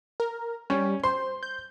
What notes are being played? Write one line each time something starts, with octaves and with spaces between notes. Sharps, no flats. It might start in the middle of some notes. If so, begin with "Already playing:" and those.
A#4
G3 C#4
C5 C6
G6